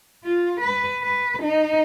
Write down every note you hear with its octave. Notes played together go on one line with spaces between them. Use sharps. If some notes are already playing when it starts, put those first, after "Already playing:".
F4
B4
B4
D#4